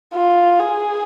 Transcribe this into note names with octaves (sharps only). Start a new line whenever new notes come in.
F4
G#4